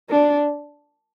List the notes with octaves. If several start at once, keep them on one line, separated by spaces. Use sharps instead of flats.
D4